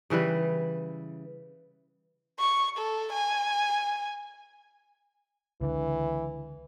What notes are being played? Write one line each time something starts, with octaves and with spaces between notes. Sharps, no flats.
C#3 E3 G3 B4
C#6
A4
G#5
C#2 D3 E3